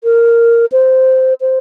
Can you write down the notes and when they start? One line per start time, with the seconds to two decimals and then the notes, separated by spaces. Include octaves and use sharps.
0.04 A#4
0.72 C5
1.41 C5